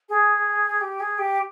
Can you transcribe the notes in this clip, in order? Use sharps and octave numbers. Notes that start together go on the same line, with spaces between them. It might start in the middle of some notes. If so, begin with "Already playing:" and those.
G#4
G4
G#4
G4